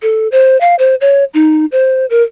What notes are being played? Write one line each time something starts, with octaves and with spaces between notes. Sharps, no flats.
A4
C5
F5
C5
C#5
D#4
C5
A#4